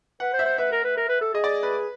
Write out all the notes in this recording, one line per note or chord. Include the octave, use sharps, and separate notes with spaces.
B4 F#5
C5
E5
C5
B4 E5
A#4
B4
A#4
B4
A4
G#4 D#5
D5
B4